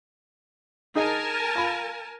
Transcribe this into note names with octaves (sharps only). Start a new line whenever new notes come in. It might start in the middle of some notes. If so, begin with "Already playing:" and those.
D#4 G#4 A#4 D#5 G#5 A5
F4 B5